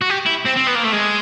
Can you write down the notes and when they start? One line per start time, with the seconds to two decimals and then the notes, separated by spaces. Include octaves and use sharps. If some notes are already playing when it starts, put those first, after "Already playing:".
0.01 F#4
0.10 G4
0.26 E4
0.46 C4
0.57 C4
0.68 B3
0.76 A#3
0.85 A3
0.93 G#3